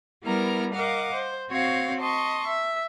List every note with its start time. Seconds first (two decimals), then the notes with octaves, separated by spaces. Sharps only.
0.23 G3 B3 E4 A#4 A#5 F6
0.74 A#4 D#5 F5 F#5 D6
1.15 C5
1.50 C4 F#4 C5 C#5 F5
2.00 D#5 A5 C6 C#6
2.47 E5